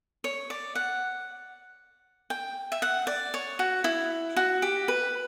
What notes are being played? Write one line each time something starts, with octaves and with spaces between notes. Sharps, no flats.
C#5
D5
F#5
G5
E5
F#5
D5
C#5
F#4
E4
F#4
G4
B4